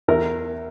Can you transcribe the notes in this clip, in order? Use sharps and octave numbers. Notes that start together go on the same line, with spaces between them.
E2 A#4